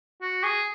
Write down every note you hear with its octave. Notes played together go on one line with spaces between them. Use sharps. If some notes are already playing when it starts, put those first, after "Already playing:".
F#4
G#4